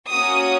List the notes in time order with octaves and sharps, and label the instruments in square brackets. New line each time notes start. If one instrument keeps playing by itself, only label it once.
[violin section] A#3 C#4 F#4 D#6